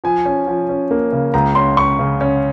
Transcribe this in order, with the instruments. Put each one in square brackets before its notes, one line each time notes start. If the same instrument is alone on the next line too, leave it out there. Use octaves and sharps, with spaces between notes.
[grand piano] F3 G#5
C#4
F3
C#4
A#3
C#3
C#2 A#5
C#4 C6
C#4 C#6
C#3
C#4